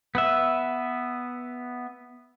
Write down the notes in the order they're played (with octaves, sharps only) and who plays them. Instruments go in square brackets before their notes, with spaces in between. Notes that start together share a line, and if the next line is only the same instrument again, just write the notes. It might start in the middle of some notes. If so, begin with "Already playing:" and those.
[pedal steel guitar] B3 B4 E5